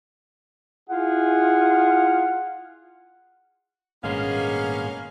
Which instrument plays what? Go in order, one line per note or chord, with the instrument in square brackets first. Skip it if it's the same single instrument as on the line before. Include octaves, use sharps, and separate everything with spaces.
[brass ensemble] E4 G#4 [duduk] F4 [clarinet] F#5
[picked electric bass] G#1 G2 A#2 [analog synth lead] G#3 [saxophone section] A#3 B3 C#4 [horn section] F5